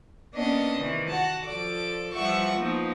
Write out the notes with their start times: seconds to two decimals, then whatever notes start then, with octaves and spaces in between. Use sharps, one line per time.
0.33 A#3 B3 C#4 D4 D#5
0.79 C3 D#3 E3
1.08 F#4 F#5 A5
1.45 F3 A4 D5 D6
2.15 E3 F3 G3 E5 F#5 C#6
2.56 F3 A#3 B3 D#4